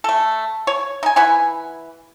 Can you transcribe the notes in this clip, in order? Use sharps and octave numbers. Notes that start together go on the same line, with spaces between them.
A3 A4
C#5
D#4 G#5
E3 F#5 G#5 B5